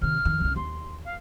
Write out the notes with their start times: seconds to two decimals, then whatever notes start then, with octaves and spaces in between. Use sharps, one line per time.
0.01 C3 D#3 F6
0.25 F2 D#3
0.40 C2 C#3
0.56 D#2 C6
1.04 F5